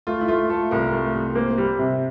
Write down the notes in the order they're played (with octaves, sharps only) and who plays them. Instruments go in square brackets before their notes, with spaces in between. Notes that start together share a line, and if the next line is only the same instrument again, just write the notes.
[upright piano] A3 [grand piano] F4
[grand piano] E4
[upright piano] A3 [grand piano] F4
[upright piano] A3 [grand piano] A4
[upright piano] C2 [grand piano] A#4
[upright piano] A3
C2
[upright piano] A#3 [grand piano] C5
[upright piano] G3
C3